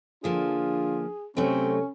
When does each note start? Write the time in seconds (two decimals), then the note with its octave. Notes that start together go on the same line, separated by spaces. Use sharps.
0.24 D3 F3 A#3 D4 F4 G#4
1.37 C3 F#3 A3 C4 C#4